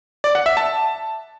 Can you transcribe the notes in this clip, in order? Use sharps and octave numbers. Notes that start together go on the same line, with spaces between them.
D5
F#5
E5
A5